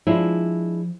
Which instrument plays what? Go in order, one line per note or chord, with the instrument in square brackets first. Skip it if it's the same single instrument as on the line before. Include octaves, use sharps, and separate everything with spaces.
[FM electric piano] F3 [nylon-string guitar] G#3 D4 E4